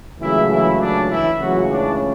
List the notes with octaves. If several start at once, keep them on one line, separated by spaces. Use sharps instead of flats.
C#2 C#3 E3 F#3 A3 C#4 E4
E3 E4
D4
E3 E4
C#2 C#3 E3 F#3 A3 C#4 F#4
D4